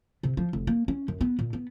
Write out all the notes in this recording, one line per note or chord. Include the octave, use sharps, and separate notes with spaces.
C3
F3
F1
A#3
C#4
F#2
B3
A#2
B3